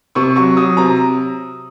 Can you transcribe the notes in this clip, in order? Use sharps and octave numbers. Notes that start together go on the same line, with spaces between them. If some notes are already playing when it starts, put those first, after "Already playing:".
C3 C#6
F#3 C#6
F#3 D#6
C3 A#5